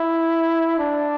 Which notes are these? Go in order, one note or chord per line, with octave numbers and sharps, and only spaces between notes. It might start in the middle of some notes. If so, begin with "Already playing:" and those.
Already playing: E4
D4